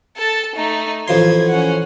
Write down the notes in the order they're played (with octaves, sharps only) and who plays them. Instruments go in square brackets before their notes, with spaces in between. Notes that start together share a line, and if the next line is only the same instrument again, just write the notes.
[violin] A4 A5
A3 D#4
[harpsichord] A1 F3 C6 [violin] G#6
[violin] C#4 F#5